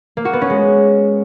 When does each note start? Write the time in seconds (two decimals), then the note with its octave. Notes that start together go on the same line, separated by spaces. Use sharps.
0.17 A#3
0.25 F#4
0.33 B3
0.42 C#4
0.50 G#3